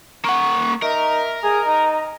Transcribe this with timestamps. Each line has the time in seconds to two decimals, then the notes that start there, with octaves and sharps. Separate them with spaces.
0.25 A#3 F#5 C#6
0.82 D#4 A#4 E5
1.44 G#4 A#5
1.66 D#4